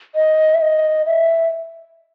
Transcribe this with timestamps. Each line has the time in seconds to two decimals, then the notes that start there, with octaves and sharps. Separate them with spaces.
0.15 D#5
0.54 E5
0.61 D#5
1.06 E5